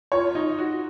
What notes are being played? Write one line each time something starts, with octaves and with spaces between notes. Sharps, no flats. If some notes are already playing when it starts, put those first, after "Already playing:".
F4 C#5
D#4
F#4